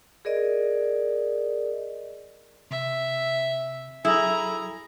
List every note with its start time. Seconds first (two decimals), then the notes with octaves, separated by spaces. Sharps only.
0.25 G#4 A#4 D5 D#5
2.71 C3 E5
4.05 F#3 E4 G#4 A4 G#5 A#5 D#6 E6